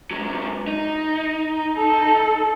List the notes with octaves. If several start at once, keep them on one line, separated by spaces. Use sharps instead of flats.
G#2 F#3
D#4
A4